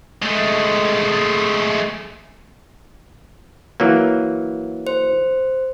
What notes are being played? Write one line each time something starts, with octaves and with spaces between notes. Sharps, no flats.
G#3 A3
E3 F#3 A#3
C5